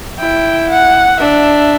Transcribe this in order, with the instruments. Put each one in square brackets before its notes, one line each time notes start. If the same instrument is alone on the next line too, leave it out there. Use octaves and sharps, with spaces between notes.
[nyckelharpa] E4 [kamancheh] G5
[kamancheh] F#5
[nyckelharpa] D4 [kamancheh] E5